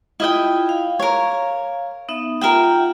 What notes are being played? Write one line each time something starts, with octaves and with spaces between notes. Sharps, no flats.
E4 F4 D#5 G5
F5
A#4 C#5
B3 D#4 E5
F4 A#4 E5 F#5 G5